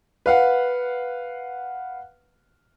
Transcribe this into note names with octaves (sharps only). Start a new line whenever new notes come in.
B4 F5 F#5